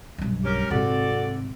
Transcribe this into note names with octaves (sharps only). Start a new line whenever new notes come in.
B1 G2
C#4 G4 A#4
G#1 C3 F#4 A4 D5